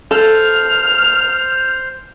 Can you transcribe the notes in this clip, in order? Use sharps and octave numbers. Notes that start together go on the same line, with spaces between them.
A4 C5 F6